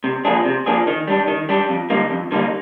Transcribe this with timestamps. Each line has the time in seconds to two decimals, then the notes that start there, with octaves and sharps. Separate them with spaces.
0.04 C3
0.25 F3 A#3 D4 G#4
0.45 C3
0.66 F3 A#3 D4 G#4
0.87 D#3
1.08 G3 D4
1.28 D#3
1.49 G3 D4
1.69 F2
1.90 D3 G3 A#3 D#4
2.11 F2
2.32 D3 G3 A#3 D#4